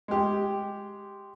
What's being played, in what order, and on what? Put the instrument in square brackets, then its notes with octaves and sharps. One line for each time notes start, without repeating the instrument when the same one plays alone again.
[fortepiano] G#3 G4